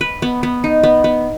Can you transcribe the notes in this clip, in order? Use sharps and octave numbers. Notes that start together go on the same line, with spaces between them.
B4
B3
B3
D#4
B3
B3